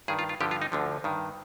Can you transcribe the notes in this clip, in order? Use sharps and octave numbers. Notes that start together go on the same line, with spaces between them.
G2 D#3 G#4
F4
F4
G2 D3 F3 G4
F4
D#4
D2 D3 F3
G2 D#3